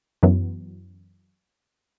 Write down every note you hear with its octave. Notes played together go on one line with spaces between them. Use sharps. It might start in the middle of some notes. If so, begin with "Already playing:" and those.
F#2 E3 F#3 B3